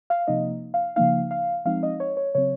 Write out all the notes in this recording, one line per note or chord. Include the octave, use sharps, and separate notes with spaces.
F5
C3 F3 A#3 D#4 D#5
F5
C#3 F3 A#3 D#4 F5
F5
F3 G#3 C4 D#4 F5
D#5
C#5
C#5
C#3 F#3 C4 C#5